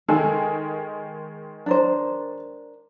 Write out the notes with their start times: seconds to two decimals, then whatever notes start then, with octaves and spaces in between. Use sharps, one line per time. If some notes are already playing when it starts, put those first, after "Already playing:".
0.09 D#3 G#3 G#4 A4
1.66 D4 A#4 C5